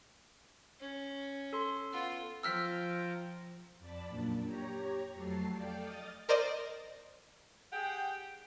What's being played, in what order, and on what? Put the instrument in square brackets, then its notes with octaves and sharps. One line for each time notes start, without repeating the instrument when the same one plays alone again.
[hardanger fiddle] C#4
[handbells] A4 C6
[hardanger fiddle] B3 F4
[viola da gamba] F3 [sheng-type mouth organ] F4 G5 A#5 [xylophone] E6 F6 B6
[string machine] F2 D5 A5 B5 A6
F#2 A#2 A#3 D4
G4 C#5 A#5
F2 F#3 A3 A5 C7
A4 D5 F5 G5 D6 G6
D#5 D#6 F6 A6
[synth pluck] A#4 C5 D5 D#5
[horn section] G4 G#4 F#5 G5